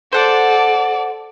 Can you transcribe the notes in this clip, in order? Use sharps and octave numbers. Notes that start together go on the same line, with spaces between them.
A4 C5 D5 F#5